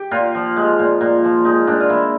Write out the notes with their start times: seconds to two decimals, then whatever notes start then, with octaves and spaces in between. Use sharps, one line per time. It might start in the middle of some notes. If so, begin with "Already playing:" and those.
Already playing: G4
0.11 A#2 F4
0.35 F3
0.56 G#3
0.79 A#2
1.01 A#2
1.24 F3
1.45 G#3 D#4
1.67 A#2 D4
1.80 F4
1.90 A#2 E4